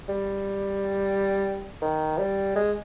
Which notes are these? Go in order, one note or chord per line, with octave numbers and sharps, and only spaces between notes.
G3
D#3
G3
G#3